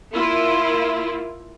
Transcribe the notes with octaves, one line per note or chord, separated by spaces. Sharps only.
A#3 E4 F4